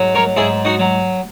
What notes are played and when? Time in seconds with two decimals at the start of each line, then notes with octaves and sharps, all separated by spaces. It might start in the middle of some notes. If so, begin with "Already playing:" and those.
Already playing: G#2 F#3
0.15 A#4 C#5
0.36 G#2 E4 G#4
0.65 D#4 F#4
0.79 F#3